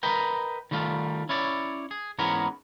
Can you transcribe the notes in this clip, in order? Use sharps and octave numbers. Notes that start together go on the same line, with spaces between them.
A#4 B4 D#5 G5
D#3 G3 A3 F4
C#4 E4 C#5 D5
G#4
G#2 E3 G#3 B3 C#4 A#4